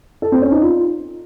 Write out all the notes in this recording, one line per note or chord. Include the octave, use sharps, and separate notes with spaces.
A4
C4
C#4
D#4
F4